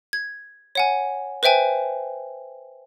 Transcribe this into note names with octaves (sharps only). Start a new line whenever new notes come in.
G#6
C#5 F#5 G#5
B4 C5 E5 G5 G#5